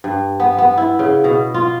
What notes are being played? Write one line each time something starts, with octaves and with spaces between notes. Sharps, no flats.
G2
B3
B3
E4
C#3
B2
F4